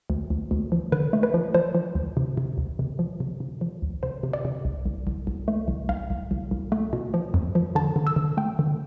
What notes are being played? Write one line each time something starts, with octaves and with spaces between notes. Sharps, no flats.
D2
D2
D2
F3
D3 B4
A3
B4
F3
F3 C5
F3
D2
C3
C3
D2
C3
F3
C3
C3
F3
D2
C3 C5
C3
D5
C3
C2
C2
C2
C2
A3
C2
C2 F5
C2
C2
C2
A3
B2
F3
F2
F3
D3 A5
D3
E6
D3
A3 G5
D3